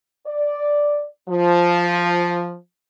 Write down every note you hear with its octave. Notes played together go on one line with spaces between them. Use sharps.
D5
F3